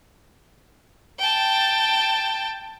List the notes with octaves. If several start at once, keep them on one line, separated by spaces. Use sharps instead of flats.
G5 A5